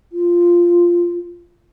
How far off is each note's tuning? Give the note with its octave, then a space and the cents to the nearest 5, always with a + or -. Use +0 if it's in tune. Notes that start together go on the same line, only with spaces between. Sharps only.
F4 -5